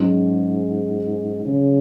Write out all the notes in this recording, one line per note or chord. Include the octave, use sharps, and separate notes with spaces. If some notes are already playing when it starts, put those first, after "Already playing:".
Already playing: G#2 F#3 C#4 G#4
C#3